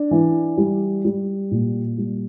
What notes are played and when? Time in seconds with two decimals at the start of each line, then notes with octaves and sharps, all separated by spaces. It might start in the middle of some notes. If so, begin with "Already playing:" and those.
Already playing: D4
0.11 E3
0.58 G3
1.05 G3
1.51 A#2
1.98 G3